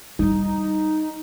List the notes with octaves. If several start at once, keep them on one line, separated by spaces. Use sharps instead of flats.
G3 D#4 E4